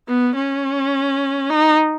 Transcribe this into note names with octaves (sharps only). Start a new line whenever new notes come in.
B3
C#4
D#4